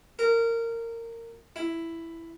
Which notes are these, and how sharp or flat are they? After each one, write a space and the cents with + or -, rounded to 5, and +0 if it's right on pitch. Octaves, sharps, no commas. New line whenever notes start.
A#4 -20
E4 +5